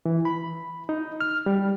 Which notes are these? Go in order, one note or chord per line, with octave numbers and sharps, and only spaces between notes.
E3
B5
D#4
F6
G3